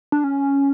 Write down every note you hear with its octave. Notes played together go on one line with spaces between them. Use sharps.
D4
C#4